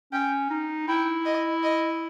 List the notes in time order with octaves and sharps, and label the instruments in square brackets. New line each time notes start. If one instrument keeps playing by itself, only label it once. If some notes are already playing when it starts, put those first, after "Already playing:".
[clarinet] C#4 [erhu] G5
[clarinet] D#4
[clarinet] E4 [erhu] G5
[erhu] D#5
D#5